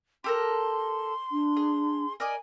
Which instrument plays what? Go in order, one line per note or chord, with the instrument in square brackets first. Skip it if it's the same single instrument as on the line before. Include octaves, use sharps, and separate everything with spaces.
[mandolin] G4 A4 A#4 [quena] C6
[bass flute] D4
[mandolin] G#4
[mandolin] A#4 D5 D#5 [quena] G#5